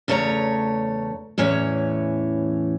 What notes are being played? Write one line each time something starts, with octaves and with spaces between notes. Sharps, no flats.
E2 C#3 A3 C#5 G#5 A#5
E2 A2 E3 C#4 C#5